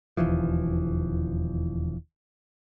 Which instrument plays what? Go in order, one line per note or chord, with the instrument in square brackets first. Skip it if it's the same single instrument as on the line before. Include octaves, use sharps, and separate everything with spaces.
[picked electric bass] E1 D#2 E3 F3